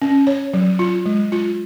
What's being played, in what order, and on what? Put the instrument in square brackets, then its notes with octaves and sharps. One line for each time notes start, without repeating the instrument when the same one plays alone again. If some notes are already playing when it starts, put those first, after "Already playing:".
[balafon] C#4
C#5
F#3
F4
G#3
F4